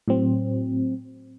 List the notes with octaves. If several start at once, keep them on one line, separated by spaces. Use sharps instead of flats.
A2 F#3 C4